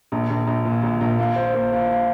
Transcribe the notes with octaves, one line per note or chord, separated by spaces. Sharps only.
A#1
A#1
A#1
A#2
A#1
A#1
A#3
C5
A#3
A#3
A#3